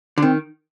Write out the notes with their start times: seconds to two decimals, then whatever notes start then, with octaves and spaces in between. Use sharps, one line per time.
0.18 D3
0.22 D#3 C4